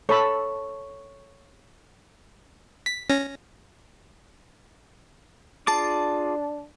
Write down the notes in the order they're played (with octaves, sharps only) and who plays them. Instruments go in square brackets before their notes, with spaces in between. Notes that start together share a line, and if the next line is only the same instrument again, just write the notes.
[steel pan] A4 A5 B5 [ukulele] C#5
[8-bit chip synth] B6
C#4 A#6
[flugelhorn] D4 [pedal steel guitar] F4 G#4 D6 [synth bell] A5 A6